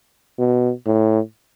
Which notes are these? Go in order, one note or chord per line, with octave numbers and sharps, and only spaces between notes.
B2
A2